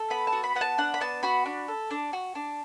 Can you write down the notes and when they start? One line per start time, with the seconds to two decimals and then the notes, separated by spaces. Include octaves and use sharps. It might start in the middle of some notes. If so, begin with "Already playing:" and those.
Already playing: A4
0.10 B3 B5
0.27 A5
0.33 F#4
0.44 B5
0.56 B3 F#5
0.61 A5
0.78 D4 F#5
0.94 B5
1.01 B3 A5
1.23 F#4 B5
1.46 D4
1.68 A4
1.91 D4
2.13 F#4
2.35 D4